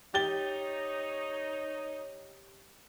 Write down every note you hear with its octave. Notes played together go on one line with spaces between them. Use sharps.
D#4 G4 C#5 A6 G7